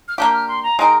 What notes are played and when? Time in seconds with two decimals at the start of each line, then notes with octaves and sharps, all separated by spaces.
0.08 F6
0.18 A#3 D4 G4 G6
0.33 F6
0.48 C6
0.63 A#5
0.79 G#3 D#4 A#4 G5